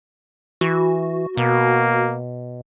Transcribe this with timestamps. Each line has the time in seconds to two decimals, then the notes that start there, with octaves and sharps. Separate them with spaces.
0.61 E3 F#4
1.37 B2 A#3